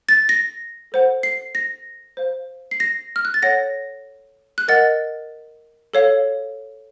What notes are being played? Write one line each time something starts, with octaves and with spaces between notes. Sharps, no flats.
A6
A#6
A4 C5 F#5
C7
A#6
C5 F5
C7
A#6
F6
F#6
A6
A4 C#5 F#5 A#6
F#6
A#4 D#5 F#5 A6
A4 C#5 F5